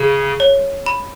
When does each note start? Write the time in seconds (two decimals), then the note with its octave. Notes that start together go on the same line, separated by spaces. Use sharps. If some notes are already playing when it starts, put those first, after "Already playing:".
Already playing: C#3 G#4
0.40 C#5
0.86 B5